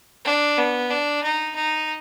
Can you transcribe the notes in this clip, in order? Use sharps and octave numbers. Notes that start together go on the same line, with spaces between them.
D4
B3
D4
D#4
D#4